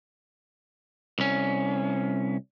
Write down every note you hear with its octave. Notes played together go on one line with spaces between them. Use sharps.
C2 C#4